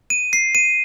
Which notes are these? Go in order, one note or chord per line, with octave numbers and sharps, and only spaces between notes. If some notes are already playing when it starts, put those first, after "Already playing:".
D#7
C7
D#7